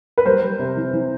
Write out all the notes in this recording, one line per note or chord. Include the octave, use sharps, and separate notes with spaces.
B4
G3 A#4 C5
G3
C3
E3
E3